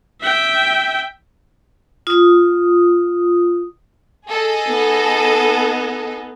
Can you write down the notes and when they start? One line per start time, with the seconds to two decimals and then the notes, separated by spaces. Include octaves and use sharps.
0.21 E5 G5
2.07 F4 D#6
4.27 G#4 A4 D#5
4.68 B3 D#4